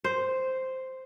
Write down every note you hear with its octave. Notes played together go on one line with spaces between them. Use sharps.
C5